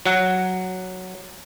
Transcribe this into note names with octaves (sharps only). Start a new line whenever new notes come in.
F#3 F#5